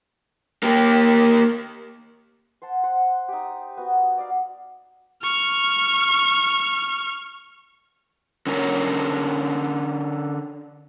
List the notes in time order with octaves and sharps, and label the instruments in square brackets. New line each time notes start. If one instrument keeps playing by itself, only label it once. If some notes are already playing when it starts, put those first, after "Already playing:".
[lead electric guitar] A#3 G4
[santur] C5 F#5 A5
C5 F#5
D#4 G4
B3 F#4
D5 F5
[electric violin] C#6 F6
[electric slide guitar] D3 C#4 A#4 C#5